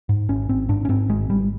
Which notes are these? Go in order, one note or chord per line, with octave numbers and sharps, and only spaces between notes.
G#2
G#1 C#4
G#1 C4
G#2 D4
C#4
G#2 C4
G#1 G#3
G#1 G3